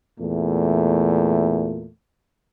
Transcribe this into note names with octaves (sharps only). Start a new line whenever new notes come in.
E2 A#2 A3